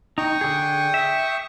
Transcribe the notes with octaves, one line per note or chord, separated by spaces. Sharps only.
D#4 G5 C#6 D#6
D3 G#4
E5